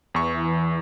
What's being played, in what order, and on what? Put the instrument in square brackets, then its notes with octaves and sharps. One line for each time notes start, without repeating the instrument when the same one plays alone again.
[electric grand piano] E2 C#6 [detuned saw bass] E3